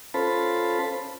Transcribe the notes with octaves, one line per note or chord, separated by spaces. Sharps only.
C#4 F4 A4 C5 A5 B5